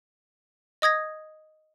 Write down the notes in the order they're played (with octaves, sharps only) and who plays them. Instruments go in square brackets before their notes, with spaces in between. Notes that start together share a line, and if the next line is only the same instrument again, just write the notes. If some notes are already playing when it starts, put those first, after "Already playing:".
[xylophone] D#5 D#6 G#6 A#6